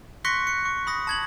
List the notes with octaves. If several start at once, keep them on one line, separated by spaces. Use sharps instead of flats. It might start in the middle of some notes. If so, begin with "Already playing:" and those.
C6 C#6 F#6 A#6 B6 C#7
C#7
C#6
B5 D#6 A#6
A5 G#6 F#7